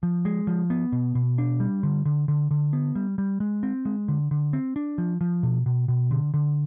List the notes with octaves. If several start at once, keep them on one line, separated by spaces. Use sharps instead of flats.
F3
G#3
F3
B3
B2
B2
D4
G3
D3
D3
D3
D3
B3
G3
G3
G#3
C4
G#3
D3
D3
C4
D4
F3
F3
B2
B2
B2
D3
D3